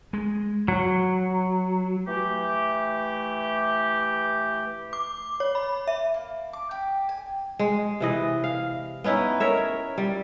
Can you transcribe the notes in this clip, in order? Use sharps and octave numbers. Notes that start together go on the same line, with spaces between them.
G#3
F#3
E3 A3 G4
D6
C#5
B5
E5
A#3
D6
G4
G#5
G#3
C3 E3 D#5
F5
B3 C#4 D#4 E4
A#4 C#5 E5
G3